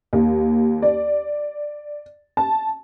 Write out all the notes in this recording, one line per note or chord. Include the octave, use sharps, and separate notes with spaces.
D#2
D5
A5